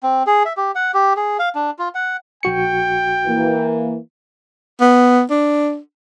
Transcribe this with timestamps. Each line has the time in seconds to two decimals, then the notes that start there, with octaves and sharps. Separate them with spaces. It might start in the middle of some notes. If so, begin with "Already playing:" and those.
0.03 C4
0.27 G#4
0.45 E5
0.57 G4
0.75 F#5
0.94 G4
1.17 G#4
1.39 F5
1.55 D4
1.79 F4
1.95 F#5
2.43 A#1 F#4 G5 C#7
3.27 E3 A#3
4.81 B3
5.30 D4